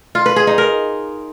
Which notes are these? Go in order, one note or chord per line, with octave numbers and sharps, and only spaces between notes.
F4
B4
G#4
D#4
A#4